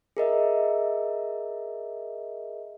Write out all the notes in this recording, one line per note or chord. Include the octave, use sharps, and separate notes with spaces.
G#4 A#4 D#5 E5